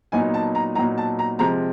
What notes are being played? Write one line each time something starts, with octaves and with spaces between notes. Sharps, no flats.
A#2 F#3 B3 D#4 G#5
A5
A#5
A#2 F#3 B3 D#4 A#5
A5
A#5
C3 F3 G#3 A#5